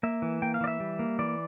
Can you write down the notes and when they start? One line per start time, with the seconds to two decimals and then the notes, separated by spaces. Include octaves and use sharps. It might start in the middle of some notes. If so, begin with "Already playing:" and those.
0.03 A#3 E5
0.22 E3
0.42 A#3 G5
0.54 F5
0.61 E3 D5
0.67 E5
0.80 G3
0.99 A#3
1.19 E3 D5